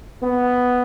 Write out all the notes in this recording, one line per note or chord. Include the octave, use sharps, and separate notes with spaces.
B3